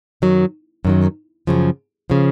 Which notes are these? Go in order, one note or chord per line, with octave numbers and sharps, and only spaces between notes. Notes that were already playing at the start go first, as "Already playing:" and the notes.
F#2 D#3 F#3
F#2 D#3 F#3
F#2 C#3 F3
C#3 F3